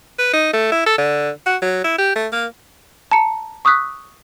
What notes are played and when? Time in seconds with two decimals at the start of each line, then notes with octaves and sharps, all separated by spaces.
0.19 B4
0.33 D#4
0.53 A3
0.72 E4
0.86 A4
0.98 D3
1.46 F#4
1.62 F#3
1.84 E4
1.98 G4
2.16 A3
2.33 A#3
3.11 A5 A#5 C#7
3.65 C#6 D#6 E6 F#6 B6